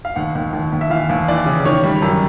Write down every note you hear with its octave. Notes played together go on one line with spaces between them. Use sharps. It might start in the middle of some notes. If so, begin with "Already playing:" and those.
F5
D#2 F#5
D#2
D#2
D#2
E5
E3 F5
D#2
E3 D5
C#3
D#3 C#5
G3
F#2